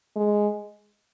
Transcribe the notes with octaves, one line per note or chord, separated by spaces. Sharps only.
G#3